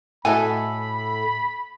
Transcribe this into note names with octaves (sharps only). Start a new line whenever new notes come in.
A2 E4 F#4 A4 D#5 G#5 A5 B5